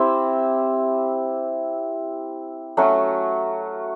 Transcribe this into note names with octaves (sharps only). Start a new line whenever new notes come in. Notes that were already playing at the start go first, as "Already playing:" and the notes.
Already playing: C4 E4 G4
F#3 A3 C#4 F#4